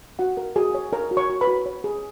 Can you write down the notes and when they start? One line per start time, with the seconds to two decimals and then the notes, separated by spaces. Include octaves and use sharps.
0.19 F#4 F#5
0.37 A#4
0.56 F#4 G#4 G#5
0.75 C#5
0.93 A#4 C#5 A#5
1.11 F#4
1.17 C#5 C#6
1.29 F#4
1.41 B4 B5
1.47 F#4
1.66 C#5
1.84 G#4